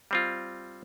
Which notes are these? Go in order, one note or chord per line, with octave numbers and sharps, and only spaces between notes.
G3 C4 F4